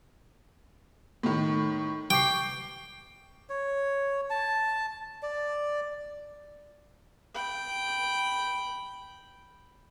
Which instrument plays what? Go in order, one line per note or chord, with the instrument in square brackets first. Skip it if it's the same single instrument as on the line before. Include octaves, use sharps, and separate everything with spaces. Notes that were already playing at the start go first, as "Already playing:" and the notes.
[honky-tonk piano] A2 D#3
[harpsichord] G5 [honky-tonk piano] C#6 D6 C7
[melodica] C#5
A5
D5
[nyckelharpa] G5 B5